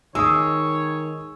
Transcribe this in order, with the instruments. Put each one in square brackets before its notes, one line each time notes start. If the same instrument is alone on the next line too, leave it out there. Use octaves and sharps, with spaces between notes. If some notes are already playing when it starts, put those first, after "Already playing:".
[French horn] D#3 [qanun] G#3 [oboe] C#5 [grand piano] D#6 E6